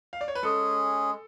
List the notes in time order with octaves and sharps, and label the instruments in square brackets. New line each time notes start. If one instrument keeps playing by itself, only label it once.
[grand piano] F5
D5
C#5
B4
[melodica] G#3 C#4 G#4 [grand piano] A4